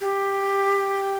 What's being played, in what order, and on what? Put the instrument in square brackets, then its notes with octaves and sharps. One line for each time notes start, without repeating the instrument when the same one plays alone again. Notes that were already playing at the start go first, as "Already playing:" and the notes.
[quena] G4